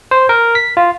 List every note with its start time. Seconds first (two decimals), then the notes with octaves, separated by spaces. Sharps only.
0.11 C5
0.29 A#4
0.55 B6
0.77 F4